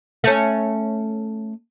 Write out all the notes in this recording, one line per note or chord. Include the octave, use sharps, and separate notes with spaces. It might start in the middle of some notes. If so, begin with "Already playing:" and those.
A3 C#4